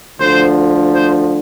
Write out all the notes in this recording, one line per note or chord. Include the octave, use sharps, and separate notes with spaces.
D2 D3 F3 C5
C5